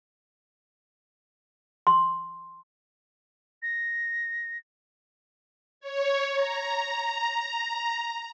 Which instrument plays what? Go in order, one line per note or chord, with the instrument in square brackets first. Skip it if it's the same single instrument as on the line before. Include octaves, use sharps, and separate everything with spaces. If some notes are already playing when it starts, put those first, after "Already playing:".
[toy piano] C6
[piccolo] A#6
[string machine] C#5
A#5